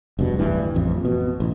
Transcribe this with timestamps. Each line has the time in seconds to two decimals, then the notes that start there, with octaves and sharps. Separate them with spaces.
0.19 F1 G2 B2
0.39 D1 G2 E3
0.75 A1 F2
1.05 B2
1.40 A1